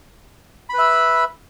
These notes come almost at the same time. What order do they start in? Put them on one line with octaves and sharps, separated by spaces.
B5 B4 E5